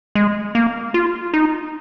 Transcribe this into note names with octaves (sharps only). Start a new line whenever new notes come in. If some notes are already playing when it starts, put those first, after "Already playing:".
G#3
A#3
F4
D#4